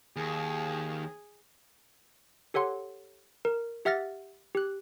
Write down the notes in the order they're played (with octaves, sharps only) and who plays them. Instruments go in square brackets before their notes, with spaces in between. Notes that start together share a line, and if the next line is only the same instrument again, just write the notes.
[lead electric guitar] D#2 [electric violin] G#4
[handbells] G4 A4 C#5 F#5 C6
A#4
G4 E5 F#5 F6 A6 A#6
G4 F#6